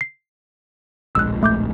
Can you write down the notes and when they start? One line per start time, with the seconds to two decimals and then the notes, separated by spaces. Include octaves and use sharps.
0.01 C7
1.15 D1 A#1 G#3 E6 F#6
1.43 A3 D6 G6